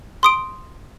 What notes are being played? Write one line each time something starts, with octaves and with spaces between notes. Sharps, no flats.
C6 D#6 D7